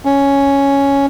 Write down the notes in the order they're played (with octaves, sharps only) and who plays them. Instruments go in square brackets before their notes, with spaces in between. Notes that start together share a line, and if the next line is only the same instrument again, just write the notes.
[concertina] C#4